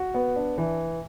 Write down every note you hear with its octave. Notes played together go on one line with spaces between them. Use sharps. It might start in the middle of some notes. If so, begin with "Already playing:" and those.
Already playing: F#4
B3
D4
E3